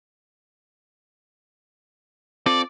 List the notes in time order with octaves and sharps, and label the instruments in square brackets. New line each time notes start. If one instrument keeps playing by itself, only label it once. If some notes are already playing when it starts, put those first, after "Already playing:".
[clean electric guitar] C4 F4 A4 [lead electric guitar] D5